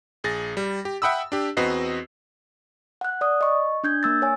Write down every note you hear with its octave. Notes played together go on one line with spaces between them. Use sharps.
A#1 G#4 A6 A#6
G3
G4
E5 F#5 G5 B5 D#6 E6
D4 G4
E2 C4 F#4 B4 D#5 C7
F#5 F#6
D5 D#6
D#5 C#6
D4 G6 G#6
A#3 E6 A6
C#5 G#5